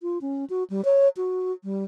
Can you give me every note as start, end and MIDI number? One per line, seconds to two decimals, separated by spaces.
0.02 0.18 65
0.21 0.45 61
0.50 0.64 66
0.70 0.84 55
0.85 1.08 73
1.17 1.52 66
1.64 1.84 55